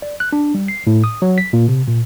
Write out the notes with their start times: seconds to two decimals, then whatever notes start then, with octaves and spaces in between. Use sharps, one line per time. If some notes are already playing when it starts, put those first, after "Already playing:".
0.02 D5
0.20 F#6
0.33 D4
0.55 G3
0.68 C7
0.87 A2
1.04 D#6
1.22 F#3
1.38 B6
1.53 A#2
1.68 C3
1.88 A#2